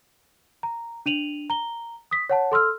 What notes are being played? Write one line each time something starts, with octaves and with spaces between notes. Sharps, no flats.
A#5
D4 D#7 F7 F#7
A#5 G7
D#6 B6
C#5 F#5 A5
A4 C6 E6 F6